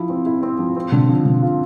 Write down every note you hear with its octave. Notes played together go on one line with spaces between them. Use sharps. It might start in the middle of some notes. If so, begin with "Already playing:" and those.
Already playing: F3 E4
C4
E4
C4
F3
C4
D3
F3
D3
F4